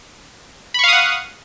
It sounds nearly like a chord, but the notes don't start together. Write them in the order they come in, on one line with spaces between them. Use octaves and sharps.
B5 C#6 F5 D#6 F#5